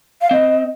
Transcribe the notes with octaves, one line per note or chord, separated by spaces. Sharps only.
F5
C4 D#5